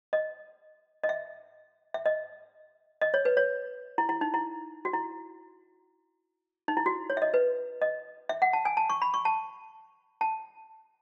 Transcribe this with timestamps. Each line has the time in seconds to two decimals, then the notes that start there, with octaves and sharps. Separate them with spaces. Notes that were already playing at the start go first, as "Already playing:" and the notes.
0.13 D#5
1.03 D#5
1.09 E5
1.94 E5
2.06 D#5
3.01 D#5
3.14 C#5
3.25 B4
3.37 C#5
3.98 E4
4.09 E4
4.21 D#4
4.34 E4
4.85 F#4
4.94 E4
6.68 D#4
6.77 E4
6.86 F#4
7.10 C#5
7.17 E5
7.22 D#5
7.34 B4
7.82 D#5
8.29 E5
8.42 F#5
8.53 A5
8.65 G#5
8.77 A5
8.90 C#6
9.02 B5
9.14 C#6
9.25 A5
10.21 A5